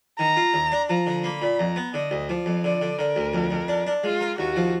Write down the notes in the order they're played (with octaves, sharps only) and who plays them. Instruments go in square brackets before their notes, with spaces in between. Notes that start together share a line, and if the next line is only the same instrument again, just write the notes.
[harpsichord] D#3 [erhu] A#5
[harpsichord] F4
D#2
D4
[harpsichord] F3 [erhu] A#5
[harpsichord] D3
[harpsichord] A#3 [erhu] B5
[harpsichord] A#2
[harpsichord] F2 [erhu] A#5
[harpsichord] B3
[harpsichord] D3 [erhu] D#5
[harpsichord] D2
[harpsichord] F3 [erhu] D5
[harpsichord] F2
[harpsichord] D3 [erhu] D5
[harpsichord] D3
[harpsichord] D3 [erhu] A#4
[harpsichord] D2
F2
F2
D4
D4
[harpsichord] G#3 [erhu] F4
[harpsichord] A#4
[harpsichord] D#2 [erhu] F#4
[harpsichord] F3